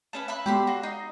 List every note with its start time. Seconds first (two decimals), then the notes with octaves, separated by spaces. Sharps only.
0.13 A3 C#4 B4 E7
0.28 E5 B5 F#6
0.46 G#3 B3 G4 B5 C6
0.67 F#4 A#6 C7
0.83 D#4